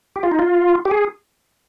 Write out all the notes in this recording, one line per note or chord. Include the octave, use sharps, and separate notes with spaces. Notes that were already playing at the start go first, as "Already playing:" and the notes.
G4
F4
D#4
F4
G4
G#4